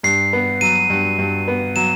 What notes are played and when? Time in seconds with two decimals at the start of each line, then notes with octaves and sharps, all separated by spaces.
0.03 G2 C7
0.33 B3
0.61 F#3 D#7
0.90 G2
1.18 G2
1.48 B3
1.76 F#3 E7